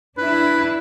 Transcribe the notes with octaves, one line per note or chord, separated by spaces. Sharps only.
D4 E4 B4